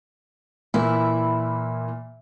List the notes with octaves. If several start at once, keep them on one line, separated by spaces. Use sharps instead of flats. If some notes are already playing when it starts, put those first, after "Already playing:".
A#2 E3 A#3 E4